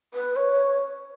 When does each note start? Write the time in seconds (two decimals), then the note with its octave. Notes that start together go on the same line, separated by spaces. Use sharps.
0.14 B4
0.36 C#5